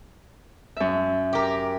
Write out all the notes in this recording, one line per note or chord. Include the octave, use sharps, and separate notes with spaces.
F#2 E5
G4 A#4